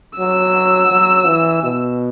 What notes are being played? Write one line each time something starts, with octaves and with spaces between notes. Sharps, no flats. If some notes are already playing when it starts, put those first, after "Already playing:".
F#3 E6
F#3
E3
B2